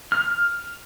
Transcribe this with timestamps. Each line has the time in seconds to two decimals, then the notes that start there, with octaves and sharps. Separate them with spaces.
0.12 F6